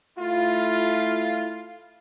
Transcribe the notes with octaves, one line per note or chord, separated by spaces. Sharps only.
A3 E4 F4